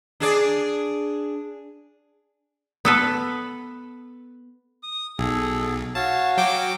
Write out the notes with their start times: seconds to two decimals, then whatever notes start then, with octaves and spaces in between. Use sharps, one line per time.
0.20 D4 G#4 D5
2.85 B3 A4 B4
4.83 D#6
5.19 B1 G#4 A4
5.95 F#4 C#5 F5 A5
6.37 F#3 G5 D6